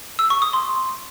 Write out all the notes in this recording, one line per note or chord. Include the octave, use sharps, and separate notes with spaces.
E6
C#6
D#6
C6